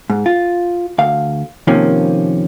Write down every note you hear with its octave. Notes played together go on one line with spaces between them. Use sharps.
G#2
F4
D2 F5
F2 C3 D#3 F3 A#3 C#4